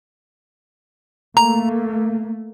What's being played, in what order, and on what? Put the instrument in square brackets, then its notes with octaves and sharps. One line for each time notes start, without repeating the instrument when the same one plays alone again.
[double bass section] A3 A#3 [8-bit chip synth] A#5